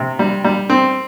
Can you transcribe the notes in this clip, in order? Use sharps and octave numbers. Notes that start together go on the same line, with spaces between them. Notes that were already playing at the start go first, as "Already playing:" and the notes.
Already playing: C3
G3
G3
C4